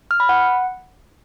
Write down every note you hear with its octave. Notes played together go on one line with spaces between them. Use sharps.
F6
B5
F#5